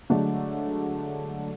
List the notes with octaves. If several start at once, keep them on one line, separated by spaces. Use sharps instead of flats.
D3 F#3 G#3 A3 D4